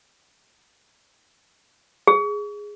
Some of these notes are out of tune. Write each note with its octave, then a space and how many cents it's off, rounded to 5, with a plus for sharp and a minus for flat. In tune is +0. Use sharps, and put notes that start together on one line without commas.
G#4 -5